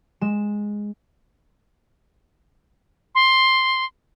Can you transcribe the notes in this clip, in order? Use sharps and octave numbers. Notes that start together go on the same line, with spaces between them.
G#3 E7
C6